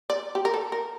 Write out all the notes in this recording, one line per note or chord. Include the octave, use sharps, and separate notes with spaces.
D5
G4
A#4
A4
A#4